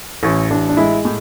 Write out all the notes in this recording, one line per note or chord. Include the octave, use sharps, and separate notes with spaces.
A1 C#4
A1 D4
D4
G#3 E4
A2